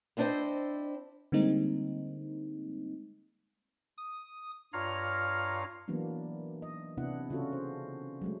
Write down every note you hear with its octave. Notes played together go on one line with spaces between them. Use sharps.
B3 C4 D4 E4 C5 D#5
D3 G3 G#3 A#3 C4 D#4
D#6
G2 F4 C#5 F5 A#5 F6
E3 F#3 A#3 B3 D4
D#5
C3 B3 D4 E4 F#5
C#3 C#4 F4 F#4 A4
C5
F#3 G#3 A3